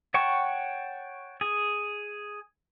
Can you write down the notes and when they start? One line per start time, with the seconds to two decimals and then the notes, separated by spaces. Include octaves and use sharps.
0.14 C#5 F#5 G5 A5 C#6
1.41 G#4